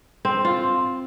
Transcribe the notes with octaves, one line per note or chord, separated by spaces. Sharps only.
C4
F4